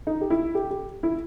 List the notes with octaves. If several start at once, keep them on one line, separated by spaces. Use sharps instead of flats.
D#4
G4
E4
G4
G4
E4